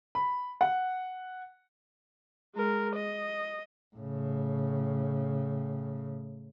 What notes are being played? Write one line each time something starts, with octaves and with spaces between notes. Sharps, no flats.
B5
F#5
G#3 A#4
D#5
A2 C#3